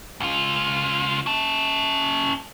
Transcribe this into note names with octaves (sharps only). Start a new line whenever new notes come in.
C#2 F4
C#4 A5